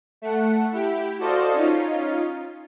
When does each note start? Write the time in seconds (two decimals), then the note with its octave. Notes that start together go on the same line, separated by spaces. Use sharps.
0.22 A3 F#5
0.72 E4 G4
1.18 F#4 A4 C5 D5 D#5 F5
1.53 C#4 D#4 F4